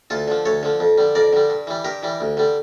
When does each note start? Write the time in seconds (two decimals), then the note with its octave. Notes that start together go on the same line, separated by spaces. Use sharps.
0.10 D2 F4 A4
0.28 D3 F3
0.45 D2 A4 C#5
0.63 D3 F3
0.80 F2
0.98 D3 G3
1.15 F2 A#4 D5
1.33 D3 G3
1.50 G2
1.67 E3 G3
1.85 G2 G4 A#4
2.03 E3 G3
2.21 D2
2.37 D3 G3